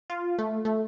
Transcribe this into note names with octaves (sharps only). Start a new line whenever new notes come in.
F4
A3
A3